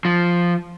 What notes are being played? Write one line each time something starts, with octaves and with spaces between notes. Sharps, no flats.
F3